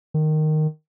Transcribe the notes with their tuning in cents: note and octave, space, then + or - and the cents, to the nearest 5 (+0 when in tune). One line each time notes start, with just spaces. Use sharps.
D#3 -10